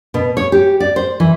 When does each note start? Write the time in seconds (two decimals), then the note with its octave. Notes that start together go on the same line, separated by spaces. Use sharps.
0.14 B2
0.37 C#5
0.52 G4
0.80 D5
0.96 C5
1.20 E3